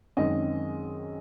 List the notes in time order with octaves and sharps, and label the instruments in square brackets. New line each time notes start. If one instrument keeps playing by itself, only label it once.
[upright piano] F#2 D#3 G#3 C4 D#5